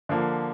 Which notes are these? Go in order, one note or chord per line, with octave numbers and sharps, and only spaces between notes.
D3 F3 A#3